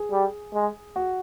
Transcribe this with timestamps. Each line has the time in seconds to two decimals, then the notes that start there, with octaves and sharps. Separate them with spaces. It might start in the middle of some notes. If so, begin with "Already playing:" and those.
Already playing: G#4
0.12 G3
0.54 G#3
0.96 F#4